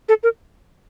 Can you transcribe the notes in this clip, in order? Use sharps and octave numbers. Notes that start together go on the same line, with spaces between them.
A4
A#4